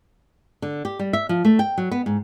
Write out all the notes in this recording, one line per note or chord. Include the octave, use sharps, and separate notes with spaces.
D3
G4
G3
E5
F3
A3
G5
F#3
B3
G#2